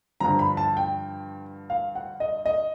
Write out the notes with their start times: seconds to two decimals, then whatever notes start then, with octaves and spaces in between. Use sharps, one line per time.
0.20 G2 D3 F3 A#5
0.39 B5
0.57 A5
0.77 G5
1.70 F5
1.95 F#5
2.20 D#5
2.46 D#5